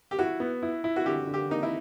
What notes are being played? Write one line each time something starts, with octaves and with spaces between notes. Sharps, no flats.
G4
E4 F#4
B3
E4
E4
F#4
D3 G4
D3
G4
A#3 D#4
E4